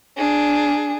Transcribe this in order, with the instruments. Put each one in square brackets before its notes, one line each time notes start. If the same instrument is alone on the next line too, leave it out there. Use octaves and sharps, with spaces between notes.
[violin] D4 G#4